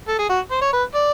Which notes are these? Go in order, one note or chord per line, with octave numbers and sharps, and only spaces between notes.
A4
G#4
F#4
C5
C#5
B4
D5